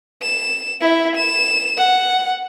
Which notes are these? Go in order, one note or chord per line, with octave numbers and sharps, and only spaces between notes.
E7
E4 E5
E7
F#5